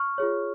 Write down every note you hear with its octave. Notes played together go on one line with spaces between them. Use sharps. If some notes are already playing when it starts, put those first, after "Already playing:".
Already playing: C#6 F6
F4 G#4 C#5